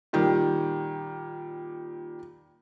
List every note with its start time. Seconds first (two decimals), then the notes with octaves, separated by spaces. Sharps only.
0.13 A#2 D#3 G3